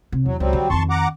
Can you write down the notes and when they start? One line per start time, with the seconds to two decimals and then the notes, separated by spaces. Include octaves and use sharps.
0.12 C3
0.26 E2 F#3
0.40 C#2 F#3 G3 C4
0.53 D3
0.70 F2 D#3 A5 C6 C#6
0.90 F#5 A#5 D6